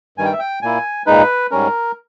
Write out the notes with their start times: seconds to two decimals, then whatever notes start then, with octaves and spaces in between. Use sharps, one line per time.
0.18 G2 D#3 G3 G#5
0.25 G5
0.33 E5
0.39 G5
0.62 A#2 A#3 E4 G#5
1.06 A#2 G#3 D#4 B4
1.51 G#2 G3 C#4 A#4